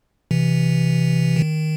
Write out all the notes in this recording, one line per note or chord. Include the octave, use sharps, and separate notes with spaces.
C3 E3
D#3